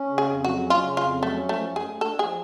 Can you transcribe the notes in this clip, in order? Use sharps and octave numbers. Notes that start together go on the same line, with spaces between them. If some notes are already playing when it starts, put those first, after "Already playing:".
Already playing: C#4
C#3
G#4
F2
F#3 F#4
C#4
F4
C#3
F2 F4
F#3
A3
C#4
F3 A3
F#2
G#4
A3
D4 A4
F3 G#4